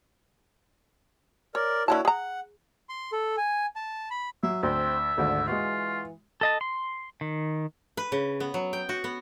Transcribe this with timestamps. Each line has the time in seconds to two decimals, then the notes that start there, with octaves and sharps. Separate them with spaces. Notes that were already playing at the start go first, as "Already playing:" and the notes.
1.55 A#4 C#5 D5
1.88 D3 A#3 E4 F#4 C#5 A5
2.05 G#4 F#5 A#5
2.89 C6
3.12 A4
3.37 G#5
3.76 A5
4.11 B5
4.43 F#3 E5
4.63 D2 C4 E5
5.18 G#1 D2 D3
5.48 E3 G#3 F4 F#4
6.41 A4 D#5 A5
6.61 C6
7.21 D#3
7.97 B4
8.12 C#3
8.40 B3
8.54 F#3
8.73 G5
8.89 F#4
9.04 B3